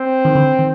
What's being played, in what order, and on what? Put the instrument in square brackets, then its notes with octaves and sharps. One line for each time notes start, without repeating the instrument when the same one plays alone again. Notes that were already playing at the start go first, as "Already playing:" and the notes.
Already playing: [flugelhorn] C4
[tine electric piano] D#3
D3
D#3